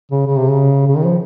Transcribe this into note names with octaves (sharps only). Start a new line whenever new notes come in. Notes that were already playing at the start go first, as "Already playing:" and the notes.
C#3
C#3
C3
C#3
C#3
D#3
F3